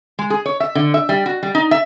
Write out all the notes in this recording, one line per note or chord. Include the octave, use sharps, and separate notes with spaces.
G#3
G#4
C#5
E5
D3
E5
G3
F#4
G3
D#4
E5